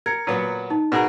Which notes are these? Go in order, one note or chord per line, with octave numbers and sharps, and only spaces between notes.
A#4 G#6 C#7
A#2 F#3 B3
D#4 A5
B2 G#4 A#4